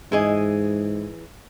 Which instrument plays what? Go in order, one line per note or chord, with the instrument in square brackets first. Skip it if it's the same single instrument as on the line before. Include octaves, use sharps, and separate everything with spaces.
[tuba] G#2 [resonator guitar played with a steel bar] E3 G#4 D#5